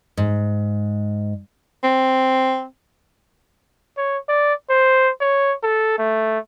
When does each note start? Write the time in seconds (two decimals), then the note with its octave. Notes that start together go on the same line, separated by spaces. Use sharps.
0.17 G#2
1.84 C4
3.97 C#5
4.29 D5
4.69 C5
5.20 C#5
5.63 A4
5.98 A3